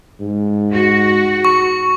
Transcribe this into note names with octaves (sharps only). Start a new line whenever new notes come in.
G#2
F#4
C#6